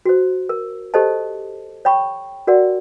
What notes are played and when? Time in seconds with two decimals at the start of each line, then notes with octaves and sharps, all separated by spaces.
0.05 F#4 C5
0.49 A#4
0.94 G4 A4 C5 D#5 A5
1.85 C#5 G5 B5 C#6
2.47 F#4 A#4 D5 F#5